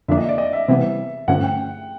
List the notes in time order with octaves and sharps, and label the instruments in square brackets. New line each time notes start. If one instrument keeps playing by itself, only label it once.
[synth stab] F2 D3 F3 A#3 D4 [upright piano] E5
[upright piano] D#5
D5
D#5
E5
[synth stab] C3 E3 G3 B3
[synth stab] G2 D3 F3 A3 C#4 [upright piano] F#5
[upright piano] G5